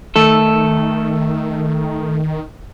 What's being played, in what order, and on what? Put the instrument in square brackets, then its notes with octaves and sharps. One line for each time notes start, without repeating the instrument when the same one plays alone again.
[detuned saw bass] D#3 [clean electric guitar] A3 A4